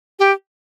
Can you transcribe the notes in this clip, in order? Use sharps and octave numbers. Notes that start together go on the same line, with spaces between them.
G4